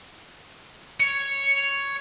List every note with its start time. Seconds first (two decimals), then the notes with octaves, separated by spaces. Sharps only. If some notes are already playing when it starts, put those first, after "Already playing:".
1.00 C#5